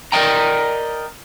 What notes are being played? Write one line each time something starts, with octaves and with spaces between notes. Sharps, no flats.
A#4 B4 D5 D#5 G5 A#5